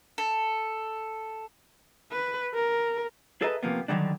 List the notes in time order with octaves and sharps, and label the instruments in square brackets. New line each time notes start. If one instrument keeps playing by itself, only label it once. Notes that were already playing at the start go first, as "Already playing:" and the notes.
[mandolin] A4
[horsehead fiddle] B4
A#4
[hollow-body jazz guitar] G#4 A4 B4 D#5 E5 A#5
C3 F3 A#3 B3
D3 D#3 F#3 G3 D4